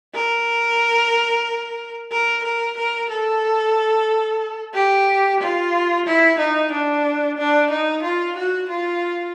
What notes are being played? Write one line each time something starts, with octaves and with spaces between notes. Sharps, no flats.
A#4
A#4
A#4
A#4
A4
G4
F4
E4
D#4
D4
D4
D#4
F4
F#4
F4